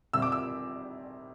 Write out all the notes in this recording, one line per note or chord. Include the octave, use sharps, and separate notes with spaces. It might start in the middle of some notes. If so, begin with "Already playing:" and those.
C3 G3 C4 E4 E6
D6
E6